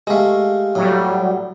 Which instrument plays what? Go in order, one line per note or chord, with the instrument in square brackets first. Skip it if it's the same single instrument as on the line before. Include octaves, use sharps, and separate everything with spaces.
[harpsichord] G#3 A3 [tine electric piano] G4 F5
[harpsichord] A2 [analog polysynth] F#3 G3